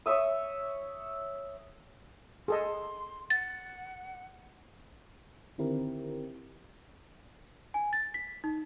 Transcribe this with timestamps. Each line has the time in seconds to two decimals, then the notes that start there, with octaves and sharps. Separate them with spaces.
0.06 C#5 E5 D#6
2.48 G#4 A4 D#5 C6
3.30 F#5 A6
5.58 D3 D#3 C4 E4 G4 A#4
7.74 G#5
7.93 A6
8.14 B6
8.44 D#4